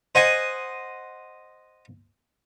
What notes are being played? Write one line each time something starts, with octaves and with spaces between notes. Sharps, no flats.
C5 D#5 F#5 G#5 C6